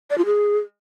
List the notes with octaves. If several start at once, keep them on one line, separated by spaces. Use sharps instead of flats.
D5
F4
G#4